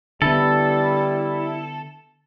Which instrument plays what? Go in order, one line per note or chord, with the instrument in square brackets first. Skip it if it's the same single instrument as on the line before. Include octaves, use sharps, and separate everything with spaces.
[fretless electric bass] D3 B3 [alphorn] G3 [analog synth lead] E4 [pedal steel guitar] A4